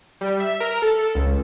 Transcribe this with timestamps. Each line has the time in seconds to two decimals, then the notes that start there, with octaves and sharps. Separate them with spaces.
0.21 G3
0.40 E5
0.60 A#4
0.82 A4
1.15 C#2